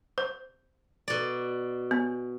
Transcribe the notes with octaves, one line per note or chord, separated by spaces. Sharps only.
C5
B2 D5
B3